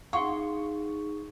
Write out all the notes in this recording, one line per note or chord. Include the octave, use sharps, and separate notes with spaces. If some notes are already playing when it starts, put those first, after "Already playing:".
D#4 G#4 F5 F#5 C6 C#6